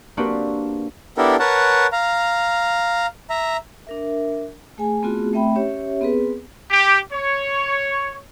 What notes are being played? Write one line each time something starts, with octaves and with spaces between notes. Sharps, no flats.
A#3 C4 D4 F#4 G4 B4
B3 D4 E4 G4 A4 A#4
A#4 B4 C#5 F#5 A5
F5 A#5
E5 A#5
D4 A#4 E5
A3 G#4 G#5
A3 B3 C4 F4 F#4 G#4
A3 C4 E5 G5 B5
C#4 G4 C#5 E5
B3 C4 G#4 B4
G4
C#5